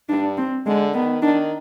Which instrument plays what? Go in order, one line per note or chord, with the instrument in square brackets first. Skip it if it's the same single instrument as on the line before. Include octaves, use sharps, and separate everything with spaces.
[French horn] G2 [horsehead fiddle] D4
[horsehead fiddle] C4
[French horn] D3 [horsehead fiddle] G#3
[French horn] D#3 [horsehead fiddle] B3
[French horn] D#3 [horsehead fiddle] D4